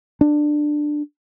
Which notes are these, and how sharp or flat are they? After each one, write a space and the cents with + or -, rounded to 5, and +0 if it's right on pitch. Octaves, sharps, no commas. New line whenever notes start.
D4 +15